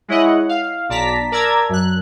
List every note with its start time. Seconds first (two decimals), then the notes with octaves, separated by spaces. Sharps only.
0.08 G#3 E4 C#5 D#5 F#5
0.49 F5
0.89 B1 D5 A5 A#5 B6
1.32 A#4 D5 A5 A#5 E6 G#6
1.69 F#2 F#6